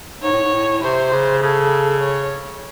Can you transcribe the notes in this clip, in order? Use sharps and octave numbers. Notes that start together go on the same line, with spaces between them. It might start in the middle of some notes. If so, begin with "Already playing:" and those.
G#2 C#5
A2
G#2
A2
C3 C5
C#3
C#3 A4
C#5